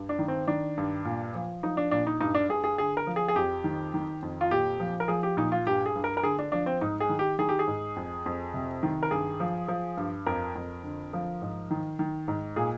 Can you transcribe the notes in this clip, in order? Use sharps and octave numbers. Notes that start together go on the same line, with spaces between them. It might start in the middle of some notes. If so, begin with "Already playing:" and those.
Already playing: G2
D4
D#3
C4
D#3 D4
G2
A#2
F3
F3 D#4
D4
A#2 D4
D#4
G2 D#4
D4
G2 G#4
G#4
D3 G#4
A#4
F3
G#4
G#4
F2 G4
D#3
D#3
F2
F4
A#2 G4
F3
A#4
F3 G#4
G4
A#2 D#4
F4
G2 G4
G#4
G2
A#4
A#4
D3 G#4
D4
F3 D4
C4
G#2 D#4
G#4
D#3
G4
D#3 G#4
G4
G#4
G#2
F2
F2
C3
D#3
A#4
G2 G#4
F3
F3
G2
F2 A#4
F2
D3
F3
G#2
D#3
D#3
G#2
A#2 G#4